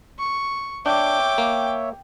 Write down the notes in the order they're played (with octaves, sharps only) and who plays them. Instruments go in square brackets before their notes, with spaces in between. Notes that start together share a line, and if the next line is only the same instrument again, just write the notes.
[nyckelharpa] C#6
[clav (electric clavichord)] D4 [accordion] C#5 E5 [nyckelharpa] G5 D6
[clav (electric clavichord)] A#3